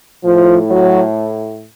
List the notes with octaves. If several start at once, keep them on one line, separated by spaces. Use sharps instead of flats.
A2 F3
F#3